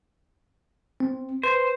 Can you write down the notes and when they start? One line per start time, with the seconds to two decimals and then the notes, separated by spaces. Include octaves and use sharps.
1.00 C4
1.43 B4 C5